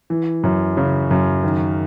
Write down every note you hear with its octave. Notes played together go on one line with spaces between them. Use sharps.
E3
F#2
C#3
F#2
D#3